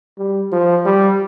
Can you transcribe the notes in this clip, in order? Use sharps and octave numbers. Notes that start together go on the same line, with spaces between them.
G3
F3
G3